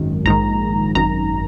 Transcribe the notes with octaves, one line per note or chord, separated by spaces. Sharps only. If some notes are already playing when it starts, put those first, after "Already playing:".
Already playing: G#1 F#2 D#3
A#1 G#2 D#3 A#5
G#1 F#2 D#3 A#5